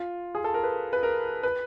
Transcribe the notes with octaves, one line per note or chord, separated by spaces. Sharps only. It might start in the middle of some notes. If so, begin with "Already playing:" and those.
Already playing: F4
G#4
A4
A#4
B4
B4
A#4
B4